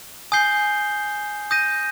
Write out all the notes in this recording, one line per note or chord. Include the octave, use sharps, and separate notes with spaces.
G#5 D#6 G6 C7 G7
D#6 G6 A#6 D#7